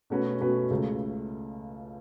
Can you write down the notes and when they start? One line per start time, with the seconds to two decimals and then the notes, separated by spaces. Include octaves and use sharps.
0.10 B2 A3 C#4 F#4 B4
0.40 B2 A3 C#4 F#4 B4
0.71 C#2 C#3 A3